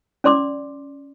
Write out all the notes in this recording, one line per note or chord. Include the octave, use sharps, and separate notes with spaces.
C#4 D5 C6 D6